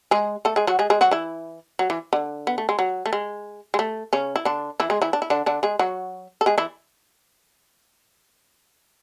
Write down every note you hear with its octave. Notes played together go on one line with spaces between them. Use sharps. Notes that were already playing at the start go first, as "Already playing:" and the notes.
G#3 G#4
A3 A4
G#3 G#4
F#3 F#4
G#3 G#4
G#3 G#4
F#3 F#4
E3 E4
F#3
E3
D3
B3
A3
G#3
F#3
A3
G#3
G#3
A3
C#3 C#4
E4
D3 D4
E3 E4
G#3 G#4
E3 E4
D4
E4
D3 D4
D3 D4
G#3 G#4
F#3 F#4
A4
G#3 G#4
E3 E4